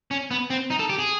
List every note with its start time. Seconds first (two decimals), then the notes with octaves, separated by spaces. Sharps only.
0.11 C#4
0.31 B3
0.50 C4
0.70 D#4
0.79 A4
0.90 G4
0.99 G#4